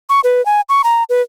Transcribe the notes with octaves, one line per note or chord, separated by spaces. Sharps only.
C#6
B4
G#5
C#6
A#5
B4